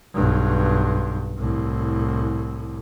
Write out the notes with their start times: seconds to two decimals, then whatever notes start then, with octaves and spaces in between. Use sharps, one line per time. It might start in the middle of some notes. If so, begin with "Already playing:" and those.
0.14 B1 G2
1.38 C2 A2